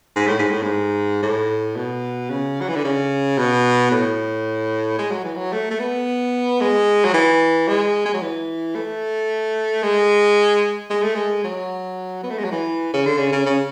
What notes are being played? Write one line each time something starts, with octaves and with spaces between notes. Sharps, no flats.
G#2
A2
G#2
A2
G#2
A2
B2
C#3
F#3
E3
D3
C#3
B2
A2
G#3
F#3
E3
F#3
A3
A3
B3
G#3
F#3
E3
G#3
G#3
F#3
E3
A3
G#3
G#3
A3
G#3
F#3
B3
A3
G#3
F#3
E3
C#3
D3
C#3
C#3
C#3